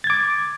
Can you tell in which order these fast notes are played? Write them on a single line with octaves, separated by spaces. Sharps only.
A6 G#6 D6